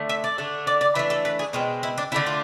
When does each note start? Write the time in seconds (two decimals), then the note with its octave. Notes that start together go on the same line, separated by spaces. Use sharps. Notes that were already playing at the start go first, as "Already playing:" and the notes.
Already playing: D3 A3
0.09 E5
0.24 D5
0.38 D3 A3 D4
0.67 D5
0.81 D5
0.95 E3 A3 D4 E5
1.10 A4
1.25 B4
1.39 G#4
1.53 B2 G#3 C4 F4
1.83 E4
1.98 D4
2.12 D3 A3 D4 E4
2.26 F4